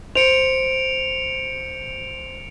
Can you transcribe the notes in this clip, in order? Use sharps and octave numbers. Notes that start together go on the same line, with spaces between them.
C5 C#7 D7 F7